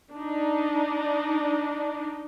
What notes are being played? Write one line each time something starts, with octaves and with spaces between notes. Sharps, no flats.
D4 D#4